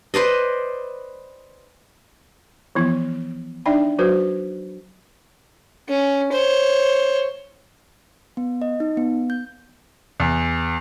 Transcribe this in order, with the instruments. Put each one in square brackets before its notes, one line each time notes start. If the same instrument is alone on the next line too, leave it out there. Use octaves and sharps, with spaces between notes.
[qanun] B4 C5 D5 D#5
[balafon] E3 F3 B3 E4
D4 D#4 D5 E5 G5 B5
F#3 F#4 B4 C5
[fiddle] C#4
C5 C#5
[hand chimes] B3
D#5
D#4
B3
G6
[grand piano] E2